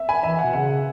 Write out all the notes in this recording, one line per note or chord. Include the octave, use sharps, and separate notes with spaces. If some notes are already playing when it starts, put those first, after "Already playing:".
Already playing: E5
G#5 B5
E3 E5 G#5
F#5
B2
C#3 F#5